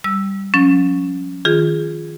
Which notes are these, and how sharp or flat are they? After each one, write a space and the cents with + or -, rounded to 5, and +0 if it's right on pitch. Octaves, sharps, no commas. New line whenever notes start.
G3 +0 E6 +0
F3 +45 C#4 +0
D#3 +15 F4 +0 G#4 +0